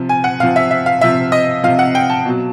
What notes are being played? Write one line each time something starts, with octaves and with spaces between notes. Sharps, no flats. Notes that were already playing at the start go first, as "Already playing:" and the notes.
Already playing: C3 F3
G#5
F#5
C3 F3 F5
E5
E5
F5
C3 F3 E5
D#5
C3 F3 F5
F#5
G5
A5
B2 F#3